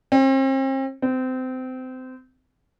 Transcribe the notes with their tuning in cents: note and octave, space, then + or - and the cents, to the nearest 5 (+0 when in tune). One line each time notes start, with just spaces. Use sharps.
C4 +40
C4 -25